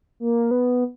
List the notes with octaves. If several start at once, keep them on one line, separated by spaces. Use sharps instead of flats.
A#3
B3